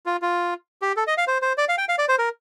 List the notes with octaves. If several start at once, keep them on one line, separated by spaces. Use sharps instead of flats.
F4
F4
G4
A4
D#5
F5
C5
C5
D5
F5
G5
F5
D5
C5
A#4